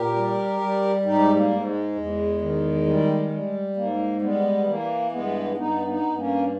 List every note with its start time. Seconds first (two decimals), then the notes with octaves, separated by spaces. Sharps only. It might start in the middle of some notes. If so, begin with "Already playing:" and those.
Already playing: A#2 G4 A#4
0.15 G3
0.61 G3
1.05 G#2 D#4 G4
1.36 A#3
1.50 G#2
1.65 G#3
1.96 E2
2.41 D#3
2.86 G3
3.31 G3
3.76 G#2 A#3
4.21 G3 G#3 B3
4.67 E3 A#3
5.12 G2 G#3 B3
5.57 G2 B3 D#4
5.87 B3 D#4
6.03 G2
6.17 A#3 C#4